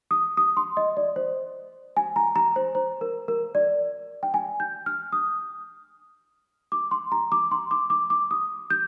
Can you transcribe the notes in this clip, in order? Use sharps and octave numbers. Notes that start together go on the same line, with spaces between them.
D#6
D#6
C6
D#5
D5
C5
G#5
A#5
A#5
C5
C5
A#4
A#4
D5
G5
G#5
G6
F6
D#6
D6
C6
A#5
D6
C6
D6
D6
D6
D#6
G6